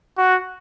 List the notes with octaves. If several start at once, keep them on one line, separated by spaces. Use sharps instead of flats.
F#4